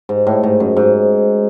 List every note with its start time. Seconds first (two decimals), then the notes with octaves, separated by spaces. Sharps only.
0.09 G#2
0.27 A2
0.43 G#2
0.60 F#2
0.77 G#2